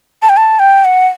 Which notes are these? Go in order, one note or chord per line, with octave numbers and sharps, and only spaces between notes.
A5
G5
A5
G5
F#5